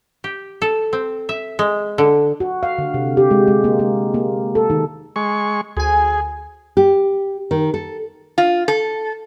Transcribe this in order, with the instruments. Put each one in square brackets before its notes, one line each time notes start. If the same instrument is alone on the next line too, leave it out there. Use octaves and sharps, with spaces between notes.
[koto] G4
A4
C4
E5
G#3
D3
[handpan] F#4
F5
D3
C3
G4
G#3
G#3
A#3
A#3
A#3
A4
D#3
[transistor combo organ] G#3 C#6
[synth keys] D2 G#5 [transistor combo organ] G#4
[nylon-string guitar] G4
D#3
A4
[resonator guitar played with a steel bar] F4
A4